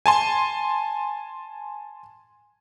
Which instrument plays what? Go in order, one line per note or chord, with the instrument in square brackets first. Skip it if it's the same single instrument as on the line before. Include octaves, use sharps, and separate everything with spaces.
[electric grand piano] G#5 A5 C6